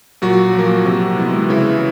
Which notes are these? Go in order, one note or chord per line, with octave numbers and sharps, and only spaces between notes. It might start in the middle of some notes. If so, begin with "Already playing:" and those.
A#2 F#3 F#4
F3
A#3
C3
E3 G#3 B3
C#3 E3 E4